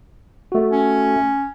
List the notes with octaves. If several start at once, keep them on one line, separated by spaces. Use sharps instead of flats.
A3 F#4
C#4